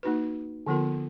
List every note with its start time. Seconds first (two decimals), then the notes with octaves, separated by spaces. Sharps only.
0.03 A#3 D#4 F#4 B4
0.66 D3 F3 B3 F4 A#4